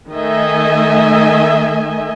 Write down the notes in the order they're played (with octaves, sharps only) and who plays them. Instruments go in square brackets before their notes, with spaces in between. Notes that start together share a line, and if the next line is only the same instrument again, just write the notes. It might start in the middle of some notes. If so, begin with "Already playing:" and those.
[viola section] D#3 A3 D#5 E5 G#5